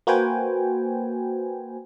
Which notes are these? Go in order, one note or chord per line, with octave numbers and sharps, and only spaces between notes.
A#3 F#4 B4 C5 G5 G#5